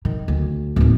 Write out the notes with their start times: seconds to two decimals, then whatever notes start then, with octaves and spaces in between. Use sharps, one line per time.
0.05 D#3
0.28 D2
0.76 D1 D#2